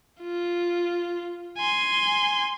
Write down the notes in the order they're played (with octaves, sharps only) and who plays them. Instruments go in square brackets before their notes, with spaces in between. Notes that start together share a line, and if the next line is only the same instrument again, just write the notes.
[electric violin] F4
G#5 C6